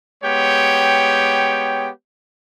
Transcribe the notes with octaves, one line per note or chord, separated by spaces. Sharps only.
G#3 B3 G4 C#5 G5